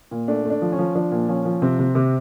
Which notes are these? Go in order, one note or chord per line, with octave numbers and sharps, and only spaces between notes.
A#2
A3 D4
A3
D4
F3
C#4
F3
F3 D4
A#2
F3 C#4
F3
C3 C4
C3
C3